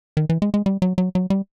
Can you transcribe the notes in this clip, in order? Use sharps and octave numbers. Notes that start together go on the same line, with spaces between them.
D#3
E3
G#3
G#3
G3
F#3
F#3
F#3
G3